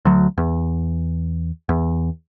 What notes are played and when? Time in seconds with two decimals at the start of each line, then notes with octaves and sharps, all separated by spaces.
0.05 D2 F#3
0.38 E2
1.69 E2